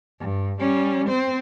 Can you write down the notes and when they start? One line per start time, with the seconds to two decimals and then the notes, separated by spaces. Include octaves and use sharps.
0.20 G2
0.60 G3 C#4
1.09 C4 C5